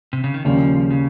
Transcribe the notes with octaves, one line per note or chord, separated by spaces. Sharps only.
C3
C#3
D#3
D#2 C#3 F3 G3 A#3 C#4
C#3